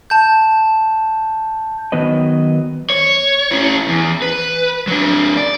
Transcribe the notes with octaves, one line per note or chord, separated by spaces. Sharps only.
A5 G6
D#3 F#3 B3 B4 D#5
C#5
C#4 E4
E2
B4
F#3 D4
D5